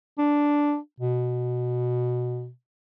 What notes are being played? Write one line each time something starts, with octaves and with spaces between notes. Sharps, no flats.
D4
B2